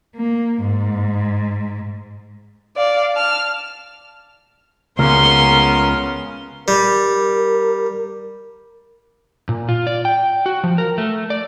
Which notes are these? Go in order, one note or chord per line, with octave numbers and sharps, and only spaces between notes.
A#3
G#2
D5 F5
A5 F6
C#2 C#3 B3 C#4 A#4 C6
G3 A#4
A#2
F4
D5
G5
F#4
F3
A#4
A3
D5